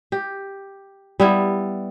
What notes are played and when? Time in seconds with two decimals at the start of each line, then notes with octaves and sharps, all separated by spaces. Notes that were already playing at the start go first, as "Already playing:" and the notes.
0.12 G4
1.20 G3 B3 E4